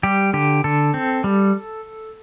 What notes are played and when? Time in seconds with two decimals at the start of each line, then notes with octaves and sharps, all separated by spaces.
0.03 G3 G4
0.33 D3 G4
0.64 D3 A4
0.94 C4
1.24 G3